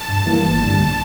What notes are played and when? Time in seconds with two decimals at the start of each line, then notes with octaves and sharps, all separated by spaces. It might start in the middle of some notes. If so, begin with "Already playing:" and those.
Already playing: A5
0.09 G2
0.26 E3 G3 A#3 E4
0.44 G1
0.60 G2 D3 G3 A#3
0.78 A#1